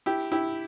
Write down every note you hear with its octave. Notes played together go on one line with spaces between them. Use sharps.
E4 G4
E4 G4